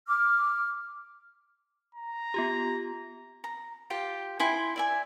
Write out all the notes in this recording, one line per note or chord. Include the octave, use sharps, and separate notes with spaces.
D6 F6
A#5
B3 F4 G4
A#5
F4 G4 G5
E4 G5 G#5 C6
D5 E5 G#5